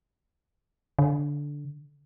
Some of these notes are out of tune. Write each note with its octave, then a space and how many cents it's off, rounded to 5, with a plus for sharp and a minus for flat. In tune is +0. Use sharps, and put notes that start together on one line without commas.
D3 -10